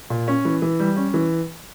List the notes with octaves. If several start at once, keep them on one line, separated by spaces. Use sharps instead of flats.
A#2
C#4
E3
E3
G3
C#4
E3